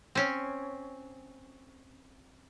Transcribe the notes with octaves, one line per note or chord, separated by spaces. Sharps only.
C4 C#4